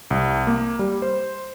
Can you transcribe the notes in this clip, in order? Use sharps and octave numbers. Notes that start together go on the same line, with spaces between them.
C2
A#3
G3
C5